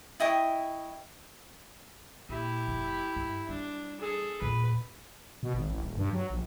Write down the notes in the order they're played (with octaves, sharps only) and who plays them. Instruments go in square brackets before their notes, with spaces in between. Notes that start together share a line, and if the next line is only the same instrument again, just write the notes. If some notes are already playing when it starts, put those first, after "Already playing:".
[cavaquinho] E4 D#5 G5 C#6
[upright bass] A#2 [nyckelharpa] E4 G4
[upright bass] F1
G2
[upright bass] G3 [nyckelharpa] D4
[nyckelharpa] G#4 A4
[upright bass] E2 A#2 [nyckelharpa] B4
[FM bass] B2
G#1
A1
D#1
G2
F#3
A#1